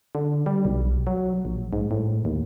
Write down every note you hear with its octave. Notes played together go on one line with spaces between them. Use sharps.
D3
G3
B1
F#3
A#1
G#2
A2
D#2